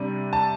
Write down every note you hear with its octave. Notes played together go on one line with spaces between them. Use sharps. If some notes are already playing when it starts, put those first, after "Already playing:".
Already playing: C3 G3 D4
A5